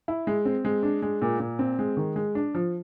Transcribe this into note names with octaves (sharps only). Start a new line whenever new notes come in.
E4
G#3
C4
G#3
D4
G#3
A#2
A#2
C4
G#3
D#3
G#3
D4
F3